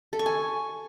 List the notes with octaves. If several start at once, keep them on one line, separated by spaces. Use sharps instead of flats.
A4
C#6
G#5